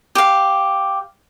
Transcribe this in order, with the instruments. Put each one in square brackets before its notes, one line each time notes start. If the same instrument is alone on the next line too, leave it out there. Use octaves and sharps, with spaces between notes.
[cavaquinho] G4 F5